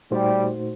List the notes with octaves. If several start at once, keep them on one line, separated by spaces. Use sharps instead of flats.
A#2 G3 A3 D#4 F#4 C5